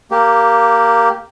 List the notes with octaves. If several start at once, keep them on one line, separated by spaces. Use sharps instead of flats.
A#3 G4